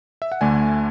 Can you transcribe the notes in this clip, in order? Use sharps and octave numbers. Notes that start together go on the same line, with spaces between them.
E5
F#5
D2 D3 A3 D4 G#5